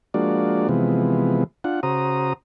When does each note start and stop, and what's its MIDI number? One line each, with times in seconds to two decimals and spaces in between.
0.14 0.68 53
0.14 0.68 56
0.14 0.68 58
0.14 0.68 62
0.14 0.68 66
0.14 0.68 74
0.69 1.44 48
0.69 1.44 52
0.69 1.44 53
0.69 1.44 56
0.69 1.44 59
1.64 1.80 62
1.64 1.80 65
1.64 1.80 78
1.83 2.33 49
1.83 2.33 66
1.83 2.33 72
1.83 2.33 82
1.83 2.33 87